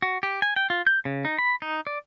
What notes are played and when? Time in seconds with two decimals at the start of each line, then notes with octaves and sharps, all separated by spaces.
0.02 F#4
0.23 G4
0.42 G#5
0.56 G5
0.70 F4
0.87 G6
1.05 C#3
1.25 D#4
1.39 B5
1.62 D#4
1.87 D5